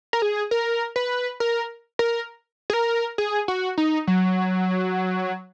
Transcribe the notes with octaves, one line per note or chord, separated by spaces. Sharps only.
A#4
G#4
A#4
B4
A#4
A#4
G#4
A#4
G#4
F#4
D#4
F#3